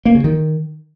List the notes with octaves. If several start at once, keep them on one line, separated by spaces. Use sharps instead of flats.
A#3
C#3
D#3